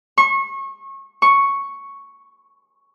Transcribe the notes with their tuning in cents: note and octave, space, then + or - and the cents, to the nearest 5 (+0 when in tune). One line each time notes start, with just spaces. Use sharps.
C#6 -30
C#6 +0